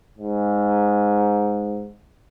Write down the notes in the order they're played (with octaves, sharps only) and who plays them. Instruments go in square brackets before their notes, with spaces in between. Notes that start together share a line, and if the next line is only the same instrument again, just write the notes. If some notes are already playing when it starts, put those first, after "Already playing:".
[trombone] G#2